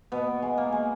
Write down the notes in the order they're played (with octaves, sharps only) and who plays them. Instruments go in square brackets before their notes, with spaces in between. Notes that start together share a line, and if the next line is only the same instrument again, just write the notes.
[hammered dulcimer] B2 B3
G#3
A#3
G#3